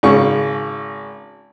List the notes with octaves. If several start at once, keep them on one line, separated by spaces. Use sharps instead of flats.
G#1 C#3 C#6